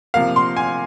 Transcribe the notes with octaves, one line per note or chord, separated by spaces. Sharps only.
C3 F3 A#3 F5
C6
G#5